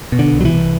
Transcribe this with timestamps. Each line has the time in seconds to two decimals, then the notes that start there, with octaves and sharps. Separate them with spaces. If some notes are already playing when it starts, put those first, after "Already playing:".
0.12 B2
0.19 D3
0.33 C2
0.41 F#3
0.45 E3
0.52 C2